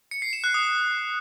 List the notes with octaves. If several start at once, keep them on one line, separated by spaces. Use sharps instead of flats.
C#7
C7
E7
F#6
D#6